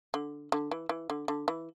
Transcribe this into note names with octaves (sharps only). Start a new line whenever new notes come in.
D3
D3
E3
E3
D3
D3
E3